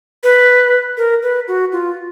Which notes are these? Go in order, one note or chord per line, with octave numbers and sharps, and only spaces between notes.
B4
A#4
B4
F#4
F4